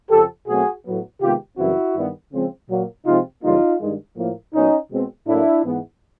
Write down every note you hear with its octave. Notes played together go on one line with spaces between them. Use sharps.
F2 C#3 F3 G4 A4
B2 F#3 A3 C4 F#4 G#4
A2 F#3 B3
C3 D#3 G#3 B3 F4 G4
F#2 C#3 E3 G3 C4 E4 F#4
G2 D#3 G3 B3
C#3 F3 G#3 C4
A#2 F#3 A#3
C3 F3 G#3 C4 D#4 F4
F#2 C#3 E3 G3 A#3 D#4 F4
G2 D#3 G#3
A2 F3 A#3
A#2 F#3 B3 C#4 D#4
B2 G#3 C4
A2 F#3 A#3 D4 E4
G#2 E3 G#3 B3